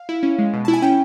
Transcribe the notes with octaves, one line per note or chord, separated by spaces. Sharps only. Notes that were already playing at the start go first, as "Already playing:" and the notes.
Already playing: F5
E4
C#4
G#3
B2
E4 A5
G#5
C#4 G5